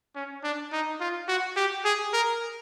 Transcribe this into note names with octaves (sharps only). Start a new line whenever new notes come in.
C#4
D4
D#4
F4
F#4
G4
G#4
A#4